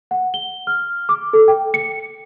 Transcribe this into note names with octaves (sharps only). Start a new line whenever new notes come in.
F#5
G7
F6
D6
A4
G5
C#7